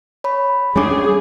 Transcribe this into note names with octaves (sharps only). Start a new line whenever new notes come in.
C#5 B5
G3 C#4 D4 G#4 C#5 G#5 D6